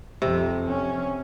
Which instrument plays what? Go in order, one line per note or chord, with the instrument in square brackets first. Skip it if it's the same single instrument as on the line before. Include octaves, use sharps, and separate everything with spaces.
[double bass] F2 [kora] C3
[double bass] C#4